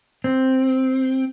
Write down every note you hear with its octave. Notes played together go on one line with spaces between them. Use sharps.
C4